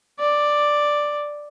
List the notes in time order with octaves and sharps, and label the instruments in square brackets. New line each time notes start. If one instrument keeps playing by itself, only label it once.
[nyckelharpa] D5